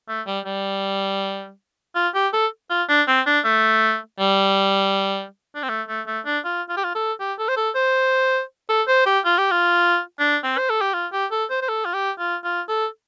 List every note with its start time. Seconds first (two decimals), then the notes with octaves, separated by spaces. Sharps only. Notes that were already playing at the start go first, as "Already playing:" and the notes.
0.09 A3
0.27 G3
0.46 G3
1.95 F4
2.15 G4
2.33 A4
2.70 F4
2.89 D4
3.08 C4
3.27 D4
3.45 A3
4.20 G3
5.55 D4
5.63 C4
5.69 A3
5.88 A3
6.07 A3
6.26 D4
6.45 F4
6.69 F4
6.77 G4
6.84 F4
6.95 A4
7.20 G4
7.39 A4
7.48 C5
7.57 A4
7.75 C5
8.69 A4
8.88 C5
9.06 G4
9.25 F4
9.38 G4
9.51 F4
10.19 D4
10.44 C4
10.58 C5
10.70 A4
10.81 G4
10.94 F4
11.13 G4
11.31 A4
11.50 C5
11.62 C5
11.69 A4
11.85 F4
11.94 G4
12.19 F4
12.44 F4
12.68 A4